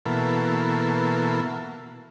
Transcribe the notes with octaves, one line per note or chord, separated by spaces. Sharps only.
B2 E3 A#3 A4